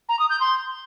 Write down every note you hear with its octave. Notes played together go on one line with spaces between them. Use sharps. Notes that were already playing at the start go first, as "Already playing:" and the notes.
A#5
D#6
G6
C6